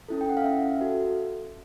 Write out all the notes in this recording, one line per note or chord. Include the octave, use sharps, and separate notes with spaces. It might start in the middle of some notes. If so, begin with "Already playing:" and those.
C#4 E4 A4
G5
F#5
F5
C#4 E5
F#4 A4